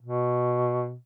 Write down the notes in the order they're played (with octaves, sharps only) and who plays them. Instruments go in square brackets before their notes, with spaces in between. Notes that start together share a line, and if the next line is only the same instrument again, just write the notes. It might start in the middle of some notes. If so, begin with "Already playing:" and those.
[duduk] B2